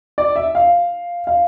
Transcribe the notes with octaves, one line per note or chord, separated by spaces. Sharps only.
D5
E5
F5
F5